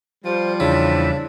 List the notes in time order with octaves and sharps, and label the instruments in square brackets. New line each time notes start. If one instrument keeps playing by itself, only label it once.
[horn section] F3 G3 [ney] C5
[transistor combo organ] E2 E4 [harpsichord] C#3 [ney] D4